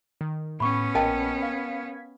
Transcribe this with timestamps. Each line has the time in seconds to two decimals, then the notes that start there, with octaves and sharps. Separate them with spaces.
0.21 D#3
0.60 A2 B3 C#4 B5 C#6
0.95 A#1 A#4 D#5 G5 A5
1.42 F5 G#6 B6